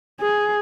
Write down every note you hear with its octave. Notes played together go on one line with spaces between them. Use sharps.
G#4